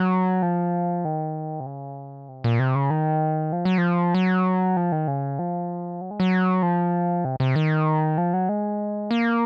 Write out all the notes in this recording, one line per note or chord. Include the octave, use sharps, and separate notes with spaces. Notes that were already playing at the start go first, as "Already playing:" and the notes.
Already playing: F#3
F3
D#3
C3
C#3
C3
A#2
C3
C#3
D#3
F3
F#3
F3
F#3
F3
D#3
C#3
F3
F#3
G#3
F#3
F3
C3
C3
D#3
F3
F#3
G#3
A#3